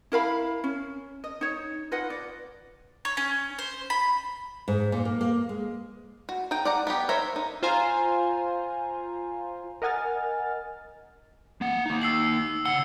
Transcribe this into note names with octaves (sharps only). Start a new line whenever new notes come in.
E4 A#4 F5 B5
C#4
D#5
D#4 C#5
F4 B4 D#5 F#5
D5
C#5
C#4
C5
B5
G#2
A#2
A#3
A#3
G#3
F#4
D#4 G5
D5 F#5 A#5
B3 D#4 G4
A#4 C5 C#5 E5 A#5
D#4
F4 C5 F5 G#5 A#5 C6
A#4 D#5 F#5 G#5 F6 A6
A#3 F#5
A#3 D#4
E6 C7 F#7
C#3 F#5 E6 C#7 G7